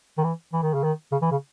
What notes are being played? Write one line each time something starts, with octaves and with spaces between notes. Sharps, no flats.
D#3
E3
E3
D#3
C#3
D#3
C#3
E3
C#3